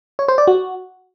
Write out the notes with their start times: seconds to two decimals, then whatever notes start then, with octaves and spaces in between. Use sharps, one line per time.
0.19 C#5
0.28 C5
0.38 D5
0.47 F#4